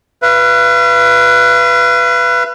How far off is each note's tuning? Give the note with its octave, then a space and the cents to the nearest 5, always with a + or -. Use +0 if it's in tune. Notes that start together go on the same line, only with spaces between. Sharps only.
B4 +0 F5 -45